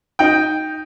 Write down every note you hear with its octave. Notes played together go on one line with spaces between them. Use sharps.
D#4 G5